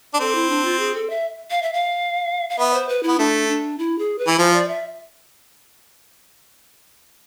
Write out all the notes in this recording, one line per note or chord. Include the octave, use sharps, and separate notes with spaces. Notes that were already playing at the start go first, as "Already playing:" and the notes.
D4
C4 A4
E4
D4
F4
G#4
A4
E5
F5
E5
F5
F5
B3 E5
C5
B4
B3 E4
A3 D4
D4
E4
G#4
B4
E3
F3 C5
D5
E5